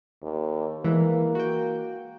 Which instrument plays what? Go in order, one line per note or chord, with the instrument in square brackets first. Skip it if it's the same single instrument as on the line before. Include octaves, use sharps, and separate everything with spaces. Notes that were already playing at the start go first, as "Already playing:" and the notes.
[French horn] D#2
[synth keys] E3 G#3 [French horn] A#3
[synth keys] F#4 G5